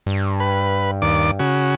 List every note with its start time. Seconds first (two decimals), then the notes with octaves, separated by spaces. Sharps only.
0.06 G2
0.40 B4
1.02 D#2 D5 D6
1.39 C#3 F#4